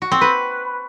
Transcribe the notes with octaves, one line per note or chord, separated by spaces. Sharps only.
F#4
C4
B4